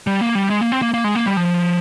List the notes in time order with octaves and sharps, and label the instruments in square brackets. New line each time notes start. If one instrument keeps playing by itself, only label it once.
[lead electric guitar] G3
A#3
G3
G#3
A#3
C4
A#3
A#3
G#3
A#3
G3
F3